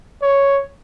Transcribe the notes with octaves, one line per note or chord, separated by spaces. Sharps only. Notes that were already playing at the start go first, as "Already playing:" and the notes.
C#5